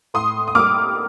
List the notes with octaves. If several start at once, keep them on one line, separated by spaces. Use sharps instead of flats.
A2 C6 D#6
D#6
G3 A#3 D6 F6